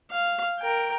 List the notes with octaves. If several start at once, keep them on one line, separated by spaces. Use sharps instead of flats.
F5
A#4 G5